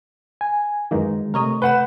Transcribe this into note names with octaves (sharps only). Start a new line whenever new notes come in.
G#5
F#2 D#3 E3 G#3 A#3 D#4
C3 A3 A#4 C#5 D#5
B4 F#5 G6 E7